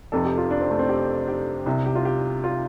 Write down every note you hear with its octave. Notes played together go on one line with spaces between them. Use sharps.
F1 F2 C3 A4
G4
F4
D4
C4
A3
C4
G4
G4
C2 C3
G4
F4
G4
F4